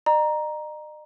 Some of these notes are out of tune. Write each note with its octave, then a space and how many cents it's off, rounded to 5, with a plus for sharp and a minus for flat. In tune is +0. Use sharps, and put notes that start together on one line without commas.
D#5 -45 A#5 +10